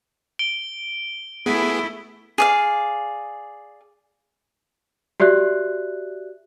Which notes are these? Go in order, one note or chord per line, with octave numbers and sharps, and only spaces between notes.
D7 G7
A3 B3 E4 G#4
G#4 D5 F5
F#4 G4 D5 E5 F#6